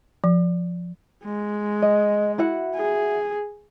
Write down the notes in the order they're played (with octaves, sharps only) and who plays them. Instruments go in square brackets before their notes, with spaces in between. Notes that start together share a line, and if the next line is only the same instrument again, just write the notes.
[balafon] F3
[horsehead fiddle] G#3
[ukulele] D#5
E4 F#4 F#5
[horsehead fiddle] G#4